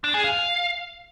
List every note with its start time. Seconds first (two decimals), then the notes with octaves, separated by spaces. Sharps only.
0.04 D4
0.14 G#4
0.24 F5